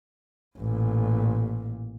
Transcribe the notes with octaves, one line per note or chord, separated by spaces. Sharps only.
A1 A#2